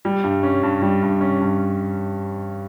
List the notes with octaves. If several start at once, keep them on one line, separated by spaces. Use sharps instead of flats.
G3
G2
C#4
G2
G3
G2
C#4
G2